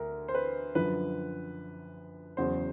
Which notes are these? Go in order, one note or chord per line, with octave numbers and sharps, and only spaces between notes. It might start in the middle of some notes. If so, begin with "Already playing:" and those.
Already playing: D2 A#4
C5
B4
F#2 D3 F3 B4
E2 C#3 F#3 C5